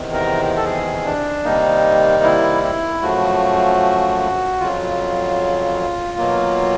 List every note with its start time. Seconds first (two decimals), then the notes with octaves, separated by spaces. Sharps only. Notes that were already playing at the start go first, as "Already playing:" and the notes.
Already playing: E2 C3 D#3
0.13 A#4
0.57 A4
0.65 G#4
1.05 D4
1.44 C3 D#3 G3 A#3 D#4
2.23 E4
2.64 E4
3.02 F#2 C#3 F3 A3 F#4
4.60 F2 C#3 F#3 F4
6.18 B2 F#3 A#3